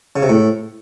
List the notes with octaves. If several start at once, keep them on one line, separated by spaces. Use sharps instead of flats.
C#3
C3
A2